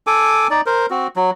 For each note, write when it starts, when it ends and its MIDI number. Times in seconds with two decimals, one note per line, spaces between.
0.07 0.48 69
0.07 0.48 80
0.07 0.48 86
0.51 0.61 63
0.51 0.61 74
0.66 0.86 70
0.66 0.86 72
0.90 1.08 60
0.90 1.08 66
1.16 1.31 54